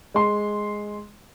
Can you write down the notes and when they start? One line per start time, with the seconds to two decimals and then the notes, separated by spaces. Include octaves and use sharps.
0.14 G#3 C6